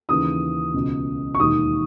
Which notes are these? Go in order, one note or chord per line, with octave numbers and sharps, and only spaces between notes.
D#2 C#3 E3 D#6
C#2 B2
C#6
E1 D#2 D#3 D#6